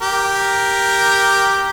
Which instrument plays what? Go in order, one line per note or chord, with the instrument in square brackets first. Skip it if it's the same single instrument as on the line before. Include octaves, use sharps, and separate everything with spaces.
[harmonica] G4 A#4